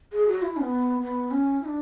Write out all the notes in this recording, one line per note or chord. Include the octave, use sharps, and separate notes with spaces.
G#4
F#4
E4
C#4
B3
B3
C#4
E4
D4